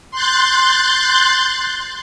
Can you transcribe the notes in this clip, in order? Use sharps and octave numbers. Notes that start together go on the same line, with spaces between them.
C6 F#6 G6 A6